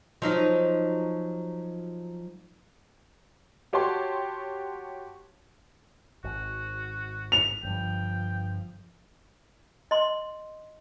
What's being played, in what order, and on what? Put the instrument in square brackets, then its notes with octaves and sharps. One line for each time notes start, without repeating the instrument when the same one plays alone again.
[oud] F3 F#3 D#4
[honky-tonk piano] F#4 G4 C#5 A5 C6
[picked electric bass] G#1 [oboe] F#4
[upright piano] F7
[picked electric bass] G1 G2 [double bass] F3 [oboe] G5
[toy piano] D#5 C6